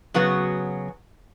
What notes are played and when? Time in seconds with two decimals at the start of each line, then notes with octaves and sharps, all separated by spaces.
0.14 C#3 F#3 B3 F#4